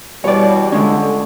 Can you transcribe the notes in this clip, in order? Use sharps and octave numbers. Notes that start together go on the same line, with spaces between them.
B2 E3 G3 C#5 D5
D3 G#3 C#4